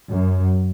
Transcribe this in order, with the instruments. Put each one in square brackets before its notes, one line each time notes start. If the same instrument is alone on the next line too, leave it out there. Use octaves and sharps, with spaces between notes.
[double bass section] F#2